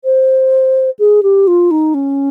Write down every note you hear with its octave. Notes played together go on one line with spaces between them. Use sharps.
C5
G#4
G4
F4
D#4
C#4